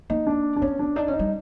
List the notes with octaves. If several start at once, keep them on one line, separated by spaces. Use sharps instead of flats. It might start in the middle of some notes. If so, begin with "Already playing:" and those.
A#3 D#4
D4
D4
B3 C#4
D4
D4 D#4
C#4
D#4
G3